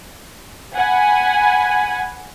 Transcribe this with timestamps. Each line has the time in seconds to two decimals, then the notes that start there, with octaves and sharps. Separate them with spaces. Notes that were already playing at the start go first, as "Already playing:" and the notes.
0.75 F#5 G#5 B5